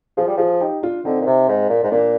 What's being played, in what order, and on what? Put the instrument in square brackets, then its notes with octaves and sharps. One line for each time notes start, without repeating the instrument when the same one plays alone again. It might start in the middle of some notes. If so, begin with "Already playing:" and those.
[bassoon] F3 [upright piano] F4 G#4
[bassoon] G3
[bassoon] F3 [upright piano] F4 G#4
[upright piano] D#4 G4
D4 F4
[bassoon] D3 [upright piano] C4 D#4
[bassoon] A#2
C3
G#2
A#2
G#2
[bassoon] A#2 [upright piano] A#3 D4